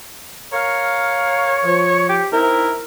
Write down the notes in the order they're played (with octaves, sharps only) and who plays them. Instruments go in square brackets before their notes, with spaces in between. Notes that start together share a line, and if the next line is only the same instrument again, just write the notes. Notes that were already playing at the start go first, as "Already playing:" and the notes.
[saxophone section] A#4 F5 [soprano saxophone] C#5
[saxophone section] F3
[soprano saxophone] G4
[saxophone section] C4 D#4 E4 [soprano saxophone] A#4